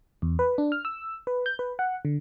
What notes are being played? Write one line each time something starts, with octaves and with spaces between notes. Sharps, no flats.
E2
B4
D4
F6
E6
B4
G6
B4
F#5
D3